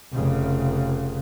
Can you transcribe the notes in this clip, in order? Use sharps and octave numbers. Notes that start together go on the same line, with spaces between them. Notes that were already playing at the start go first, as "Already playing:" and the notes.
F1 C#3